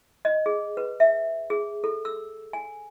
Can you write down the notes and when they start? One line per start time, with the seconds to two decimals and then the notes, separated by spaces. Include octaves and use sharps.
0.25 D#5
0.46 G#4
0.77 B4
1.00 E5
1.50 G#4
1.84 A4
2.05 E6
2.53 G#5